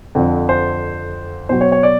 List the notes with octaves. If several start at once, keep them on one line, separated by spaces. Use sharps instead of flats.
F2 D3 F3
C5
B2 F#3 C5
C#5
C#5
D5